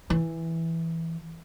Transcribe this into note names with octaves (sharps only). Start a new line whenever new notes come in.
E3